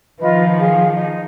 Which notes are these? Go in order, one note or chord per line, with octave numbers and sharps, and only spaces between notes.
D#3 F3 F4 B4 D#5
G#4 F5
D#4